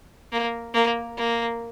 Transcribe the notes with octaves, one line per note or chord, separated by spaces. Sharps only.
A#3
A#3
A#3